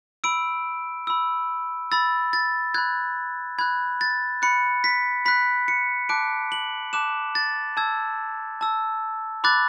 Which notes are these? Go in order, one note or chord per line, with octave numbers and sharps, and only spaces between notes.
B5 E6 D7
B5 E6
B5 E6 A6
A6
B5 F#6 G#6
B5 F#6 G#6
A6
B5 F#6 C#7
B6
B5 F#6 B6
C#7
A5 D6 F#6 D7
F#7
A5 D6 F#6 E7
A6
A5 E6 G#6
A5 E6
B5 D6 F#6 A6